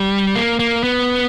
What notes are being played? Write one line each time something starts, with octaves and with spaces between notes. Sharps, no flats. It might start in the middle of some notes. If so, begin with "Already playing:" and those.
Already playing: G3
A#3
A#3
B3